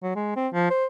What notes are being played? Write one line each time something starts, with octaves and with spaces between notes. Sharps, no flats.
F#3
G#3
C4
F3
C5